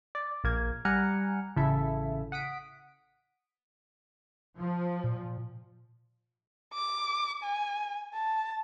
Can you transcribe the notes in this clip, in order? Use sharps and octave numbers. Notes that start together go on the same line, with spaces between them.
D5
A#1 A#3 G#6
G3 F#5 G#5 A#5 F6 C#7
A1 C#3 E4 A4 E5
F#5 D#6 B6 D7
F3
A#2
D6
G#5
A5